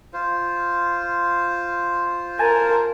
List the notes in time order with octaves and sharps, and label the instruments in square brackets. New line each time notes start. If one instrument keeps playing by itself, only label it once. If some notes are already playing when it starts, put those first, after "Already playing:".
[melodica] F4 C5
[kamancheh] A#4 [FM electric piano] G#5 A5